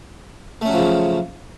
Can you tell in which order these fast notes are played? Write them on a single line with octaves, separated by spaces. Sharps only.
A3 C#4 F#3 F3 C#3